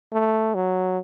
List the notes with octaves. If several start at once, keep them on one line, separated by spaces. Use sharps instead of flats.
A3
F#3